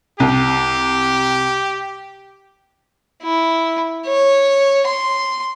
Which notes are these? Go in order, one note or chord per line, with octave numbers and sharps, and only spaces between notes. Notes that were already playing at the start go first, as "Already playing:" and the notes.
C2 G4
E4
C#5
C6